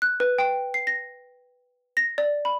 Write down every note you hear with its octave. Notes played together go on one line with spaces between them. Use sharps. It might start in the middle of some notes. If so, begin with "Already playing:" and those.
F#6
B4
G5
C7
A#6
A#6
D5
B5